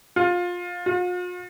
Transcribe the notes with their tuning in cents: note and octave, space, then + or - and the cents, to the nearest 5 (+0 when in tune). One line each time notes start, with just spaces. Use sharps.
F4 +20
F4 +45